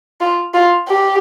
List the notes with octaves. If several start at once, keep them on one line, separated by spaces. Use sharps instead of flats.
F4
F4
G4